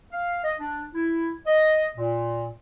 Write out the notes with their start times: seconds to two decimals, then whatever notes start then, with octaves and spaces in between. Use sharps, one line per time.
0.12 F5
0.44 D#5
0.59 D4
0.95 E4
1.47 D#5
1.96 A#2